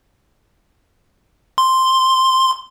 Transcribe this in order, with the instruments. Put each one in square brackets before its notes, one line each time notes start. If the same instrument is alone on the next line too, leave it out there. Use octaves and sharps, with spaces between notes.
[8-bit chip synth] C6